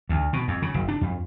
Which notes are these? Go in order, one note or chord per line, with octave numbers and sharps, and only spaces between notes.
D2
B2
F2
C#3
F#1
D4
F2